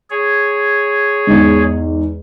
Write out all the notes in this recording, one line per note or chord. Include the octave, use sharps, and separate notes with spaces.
G#4 C#5
E2 G#2